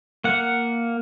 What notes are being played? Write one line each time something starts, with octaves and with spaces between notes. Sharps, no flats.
A#3 F#5